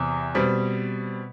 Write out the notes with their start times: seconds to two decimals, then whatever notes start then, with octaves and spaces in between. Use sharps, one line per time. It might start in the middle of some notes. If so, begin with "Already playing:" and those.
Already playing: E2 C3
0.35 B2 G3 C4